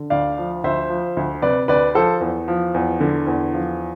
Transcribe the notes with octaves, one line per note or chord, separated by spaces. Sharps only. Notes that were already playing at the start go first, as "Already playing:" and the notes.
Already playing: D3
D2 D5 F5
F3
D2 C5 E5
F3
D2
C3 B4 D5
D2 B4 D5
F3 A4 C5
E2
F3
E2
D3
E2
F3